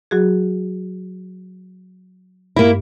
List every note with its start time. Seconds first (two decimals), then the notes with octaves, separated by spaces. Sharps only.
0.11 F#3 F#4 G#4
2.56 G2 A#3 E4